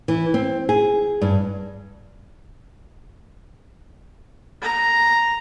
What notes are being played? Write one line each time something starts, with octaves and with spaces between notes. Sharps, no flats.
E3
C4
G#4
G2
A#5